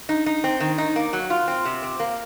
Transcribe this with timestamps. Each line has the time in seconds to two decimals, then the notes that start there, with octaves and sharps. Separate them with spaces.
0.09 D#4
0.26 D#4
0.44 C4
0.60 D#3
0.78 D#4
0.96 A#3
1.13 F#3
1.30 F4
1.48 C4
1.65 C3
1.83 C4
2.00 A#3